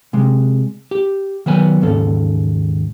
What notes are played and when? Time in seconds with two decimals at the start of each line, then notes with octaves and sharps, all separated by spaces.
0.13 C3 G#3
0.91 G4
1.46 D#3 F#3 B3 G#5
1.81 D#2 G#2 C#3 A4